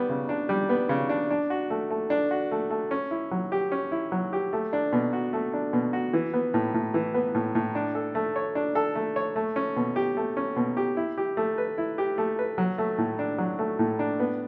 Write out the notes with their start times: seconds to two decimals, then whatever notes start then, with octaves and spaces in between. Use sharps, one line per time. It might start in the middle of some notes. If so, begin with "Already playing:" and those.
Already playing: G3 B3
0.09 C#3
0.29 D4
0.49 G3
0.69 B3
0.89 C#3
1.09 D4
1.30 D4
1.50 F#4
1.70 A3
1.90 A3
2.10 D4
2.31 F#4
2.51 A3
2.71 A3
2.91 C#4
3.11 E4
3.31 F#3
3.52 G4
3.72 C#4
3.92 E4
4.12 F#3
4.33 G4
4.53 A3
4.73 D4
4.93 B2
5.13 F#4
5.33 A3
5.54 D4
5.73 B2
5.93 F#4
6.13 E3
6.33 B3
6.54 A2
6.74 A2
6.94 E3
7.14 B3
7.35 A2
7.55 A2
7.75 D4
7.95 A4
8.15 A3
8.36 C#5
8.55 D4
8.75 A4
8.95 A3
9.16 C#5
9.36 A3
9.56 C#4
9.76 B2
9.96 G4
10.17 A3
10.37 C#4
10.56 B2
10.77 G4
10.97 E4
11.18 G4
11.37 A3
11.58 B4
11.78 E4
11.98 G4
12.18 A3
12.39 B4
12.58 F#3
12.78 A3
12.98 A2
13.19 D4
13.38 F#3
13.59 A3
13.79 A2
13.99 D4
14.19 B3